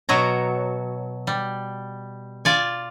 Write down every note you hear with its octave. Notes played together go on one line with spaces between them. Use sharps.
B2 F#3 C#5 A#5
G3
F4 D5 G#5